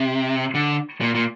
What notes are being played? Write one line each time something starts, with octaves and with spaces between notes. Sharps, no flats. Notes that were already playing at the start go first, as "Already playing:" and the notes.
Already playing: C3
D3
A#2
A#2